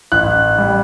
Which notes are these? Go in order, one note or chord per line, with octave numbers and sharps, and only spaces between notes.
A1 F#6
G3